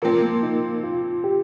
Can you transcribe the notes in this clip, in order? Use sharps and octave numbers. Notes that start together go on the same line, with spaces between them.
A#2 F3 C4 A#4
A#3
D#4
F4
G4